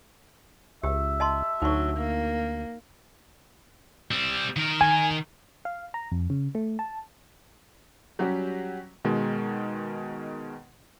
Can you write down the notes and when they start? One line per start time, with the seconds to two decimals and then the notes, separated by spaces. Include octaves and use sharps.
0.84 C#2 G4 E5
1.20 D#5 A5 C6
1.62 D2 F#3 D#4 C#6
1.98 A#3
4.11 G3 C4
4.56 D#3 A#4
4.81 G#5
5.65 F5
5.94 A#5
6.12 F2
6.30 C#3
6.55 A3
6.79 A5
8.19 F#3 G3 C#4 F#4 G4
9.05 B2 D#3 G#3